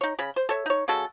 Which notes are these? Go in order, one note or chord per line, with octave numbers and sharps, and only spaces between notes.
D#4 C#5
C#3 B5
C5
A4 C#5 E5
D#4 C#5
C#3 G#3 F#4 A4